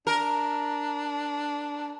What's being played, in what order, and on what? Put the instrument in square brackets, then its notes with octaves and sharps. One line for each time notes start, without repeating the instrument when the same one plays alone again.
[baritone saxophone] D4 [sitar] A#4